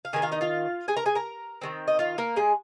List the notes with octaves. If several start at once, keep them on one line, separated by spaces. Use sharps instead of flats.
F5
D#3 A#3 G#4 G#5
F4 F5
D#4 D#5
F4 F5
G#4 G#5
A#4 A#5
G#4 G#5
A#4 A#5
D#3 G#3 C4
D#5
F4 F5
A#3 A#4
G#3 G#4